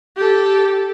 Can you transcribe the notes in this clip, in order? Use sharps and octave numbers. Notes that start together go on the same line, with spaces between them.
G4 A4